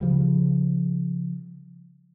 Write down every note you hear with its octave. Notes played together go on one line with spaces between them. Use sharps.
C#3 F3 G3